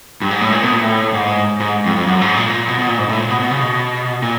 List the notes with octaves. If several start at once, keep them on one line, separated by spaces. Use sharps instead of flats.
G2
G#2
A2
A#2
B2
A#2
A2
G#2
G#2
F2
F2
F#2
G#2
A#2
B2
B2
A#2
G#2
A2
A#2
B2
B2
C#3
B2
A#2